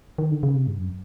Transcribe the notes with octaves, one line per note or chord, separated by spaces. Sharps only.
D#3
D3
C#3
C3
G2
F#2